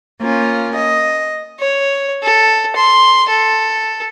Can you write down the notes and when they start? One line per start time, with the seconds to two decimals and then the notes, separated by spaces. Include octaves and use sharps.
0.21 A#3 C#4 F4
0.76 D#5
1.60 C#5
2.23 A4
2.76 C6
3.29 A4